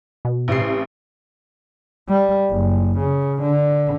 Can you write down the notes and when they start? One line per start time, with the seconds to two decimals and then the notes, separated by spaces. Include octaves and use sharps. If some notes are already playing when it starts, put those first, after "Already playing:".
0.25 B2
0.48 A1 C3 C7
2.08 G3
2.51 F#1
2.99 C#3
3.42 D3